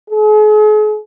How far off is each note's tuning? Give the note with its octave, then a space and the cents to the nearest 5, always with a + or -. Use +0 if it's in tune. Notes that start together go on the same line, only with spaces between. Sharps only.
G#4 +45